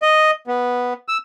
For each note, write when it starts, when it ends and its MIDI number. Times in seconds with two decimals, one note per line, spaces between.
0.02 0.31 75
0.47 0.93 59
1.08 1.17 88